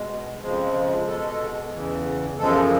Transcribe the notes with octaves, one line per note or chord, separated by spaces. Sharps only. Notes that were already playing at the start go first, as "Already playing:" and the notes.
Already playing: B2 G#3
F2 C#3 F3 G#3
B2 G#3 A4
E2 C#3 E3
F#2 C#3 F3 G#3 A4